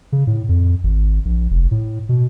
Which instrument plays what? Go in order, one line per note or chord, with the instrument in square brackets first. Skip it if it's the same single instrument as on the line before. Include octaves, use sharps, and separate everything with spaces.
[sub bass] C#3
A2
F2
G#1
A#1
F1
A2
B2